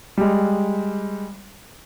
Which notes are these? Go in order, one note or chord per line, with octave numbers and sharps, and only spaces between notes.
G3 G#3